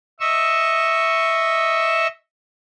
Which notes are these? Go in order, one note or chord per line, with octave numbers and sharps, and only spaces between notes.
D#5 E5 C#6 E6